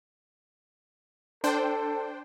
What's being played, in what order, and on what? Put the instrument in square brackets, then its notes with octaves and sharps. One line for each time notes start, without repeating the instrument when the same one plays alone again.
[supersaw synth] D4 C5 G5 [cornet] A4